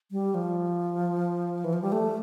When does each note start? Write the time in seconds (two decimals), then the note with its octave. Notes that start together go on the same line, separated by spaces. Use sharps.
0.11 G3
0.34 F3
1.64 E3
1.73 F3
1.82 G3
1.92 A3